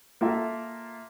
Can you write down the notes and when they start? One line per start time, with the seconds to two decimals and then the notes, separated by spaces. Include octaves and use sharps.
0.21 A#3 F4 A4 E5